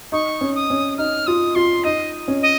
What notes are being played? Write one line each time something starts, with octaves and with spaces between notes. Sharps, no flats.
D#4 C#6
C#4
D#6
C#4
D#4 F6
F4 D#6
F4 C6
D#4 D#5
C#4
D#5